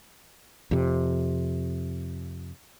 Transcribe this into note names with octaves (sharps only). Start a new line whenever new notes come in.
F2 C3